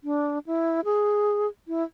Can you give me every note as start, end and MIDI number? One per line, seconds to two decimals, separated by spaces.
0.04 0.39 62
0.47 0.81 64
0.85 1.47 68
1.68 1.83 64